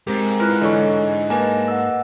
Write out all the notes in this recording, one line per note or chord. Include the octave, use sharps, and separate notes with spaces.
G#2 C4 G4 A#4
E4 F4 B4 F6 F#6
D3 E3 A4 C#5 D#5 C#6
A#3 B4 D#5 G#5 A5
F#5 E6